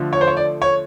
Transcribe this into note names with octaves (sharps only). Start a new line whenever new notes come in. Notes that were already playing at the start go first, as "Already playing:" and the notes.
Already playing: D3 F3 A3
C#5
C5
C#5
D5
C#5